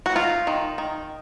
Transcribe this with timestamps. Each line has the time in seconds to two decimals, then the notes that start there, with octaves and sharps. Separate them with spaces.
0.06 F#4
0.15 D#4 F4
0.47 D#3
0.78 D#3